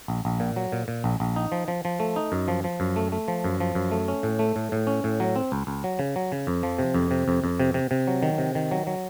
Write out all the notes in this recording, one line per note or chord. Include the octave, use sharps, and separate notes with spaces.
A#1
A#1
A#2
F#3
A#2
A#2
A#1
A#1
D#4
F3
F3
F3
A3
D#4
F#2
F3
F3
F#2
A3
A3
F3
F#2
F3
F#2
A3
C#4
A2
A3
A2
A2
C#4
A2
F#3
C4
C#2
C#2
F#3
C#3
F#3
C#3
F2
F3
C3
F2
C3
F2
F2
C3
C3
C3
F#3
D#3
C3
D#3
F#3
F#3